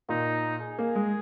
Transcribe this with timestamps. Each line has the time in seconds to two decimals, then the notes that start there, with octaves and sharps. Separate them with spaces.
0.09 A#2 D#4
0.62 G#4
0.79 A#3
0.95 G#3